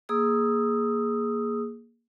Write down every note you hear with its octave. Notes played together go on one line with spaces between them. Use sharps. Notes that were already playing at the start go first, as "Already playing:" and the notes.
A#3 G#4 D#6 E6